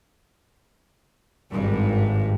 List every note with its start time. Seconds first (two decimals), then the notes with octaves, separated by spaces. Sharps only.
1.53 G#1 G2